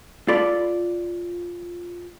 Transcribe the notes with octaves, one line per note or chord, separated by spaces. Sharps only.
F4 A4 D5 B5